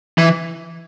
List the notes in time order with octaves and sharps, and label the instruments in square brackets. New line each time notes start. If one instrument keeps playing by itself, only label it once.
[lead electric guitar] E3